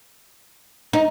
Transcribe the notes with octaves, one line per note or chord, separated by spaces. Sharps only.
D#4